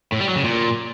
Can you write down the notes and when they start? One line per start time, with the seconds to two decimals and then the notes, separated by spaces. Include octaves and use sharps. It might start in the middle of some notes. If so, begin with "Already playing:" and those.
0.12 A2
0.20 G3
0.28 F#3
0.36 C#3
0.44 A#2